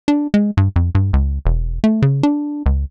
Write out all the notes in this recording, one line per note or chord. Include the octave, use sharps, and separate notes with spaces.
D4
G#3
G2
F2
G2
C#2
E1
A3
C#3
D4
C#2